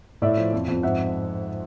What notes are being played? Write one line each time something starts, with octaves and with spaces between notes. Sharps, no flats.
A2 D5 E5
F3
F2
F2
G#2 E5 F#5